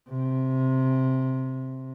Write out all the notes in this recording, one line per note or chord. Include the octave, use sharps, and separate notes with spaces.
C3